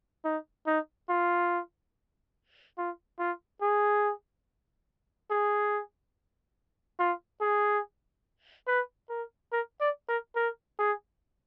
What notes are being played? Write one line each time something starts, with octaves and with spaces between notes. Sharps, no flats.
D#4
D#4
F4
F4
F4
G#4
G#4
F4
G#4
B4
A#4
A#4
D5
A#4
A#4
G#4